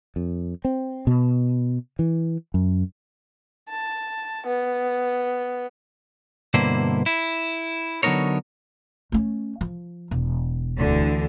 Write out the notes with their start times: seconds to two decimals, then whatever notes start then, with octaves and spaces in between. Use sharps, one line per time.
0.16 F2
0.65 C4
1.07 B2
1.99 E3
2.54 F#2
3.69 A5
4.47 B3
6.54 G2 B2 D3 A#3 E4 C5
7.06 E4
8.03 D3 F#3 B3 D#4 A#4 C#5
9.12 A3 C#4
9.61 F3
10.11 E1
10.77 D2 D3 E3